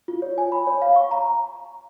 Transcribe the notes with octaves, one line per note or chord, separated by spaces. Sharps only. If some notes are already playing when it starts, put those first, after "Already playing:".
F4
C#5
G#5
B5
C#5
F5
C#6
A#5